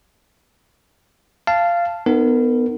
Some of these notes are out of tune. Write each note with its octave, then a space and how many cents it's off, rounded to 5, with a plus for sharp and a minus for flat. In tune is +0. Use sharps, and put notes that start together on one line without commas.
F5 -15 A5 +0
B3 +10 D#4 -25 A#4 -30